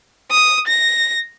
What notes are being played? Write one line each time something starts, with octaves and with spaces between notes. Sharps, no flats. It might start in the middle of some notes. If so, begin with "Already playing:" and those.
D#6
A#6